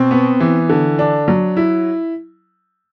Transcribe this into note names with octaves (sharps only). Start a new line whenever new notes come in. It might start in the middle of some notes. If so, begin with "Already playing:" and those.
Already playing: B2 C4
B3
E3
D3
D4
F#3
E4